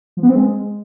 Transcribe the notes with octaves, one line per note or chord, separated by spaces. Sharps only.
F3
B3
C4
G#3